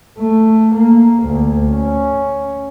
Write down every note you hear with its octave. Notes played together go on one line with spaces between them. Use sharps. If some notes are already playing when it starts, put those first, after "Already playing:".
A3
A#3
D2
C#4